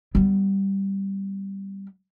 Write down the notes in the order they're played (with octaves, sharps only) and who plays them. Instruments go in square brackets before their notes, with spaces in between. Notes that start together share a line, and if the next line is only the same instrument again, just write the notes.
[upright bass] G3 B3